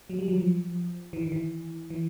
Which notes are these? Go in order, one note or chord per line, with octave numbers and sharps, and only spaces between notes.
F#3
G3
F#3
F3
E3
D#3
E3
E3